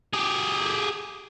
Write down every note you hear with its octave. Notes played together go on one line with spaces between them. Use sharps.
G4 G#4